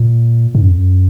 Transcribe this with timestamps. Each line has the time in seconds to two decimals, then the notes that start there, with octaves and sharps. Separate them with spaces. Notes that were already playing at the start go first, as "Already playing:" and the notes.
Already playing: A#2
0.55 G#2
0.62 F#2
0.70 F2
0.77 F#2